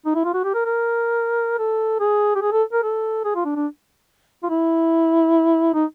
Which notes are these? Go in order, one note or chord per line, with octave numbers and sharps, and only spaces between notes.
D#4
E4
F4
F#4
G4
A#4
A#4
A4
G#4
G4
G#4
A4
A#4
A4
G#4
F4
D4
D4
F4
E4
D#4